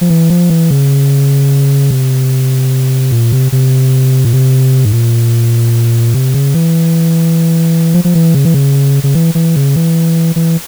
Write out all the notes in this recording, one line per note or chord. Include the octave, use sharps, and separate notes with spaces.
F3
E3
F3
E3
C#3
C3
A#2
C3
C3
A#2
C3
G#2
A#2
C3
C#3
E3
F3
F3
E3
C#3
E3
C#3
C#3
E3
E3
C#3
E3
E3